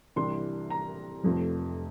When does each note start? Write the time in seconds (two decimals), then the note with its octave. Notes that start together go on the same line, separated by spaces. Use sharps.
0.16 C2 C3 E3 G3 D4 C6
0.70 A#5
1.23 F1 F2 C3 F3 A3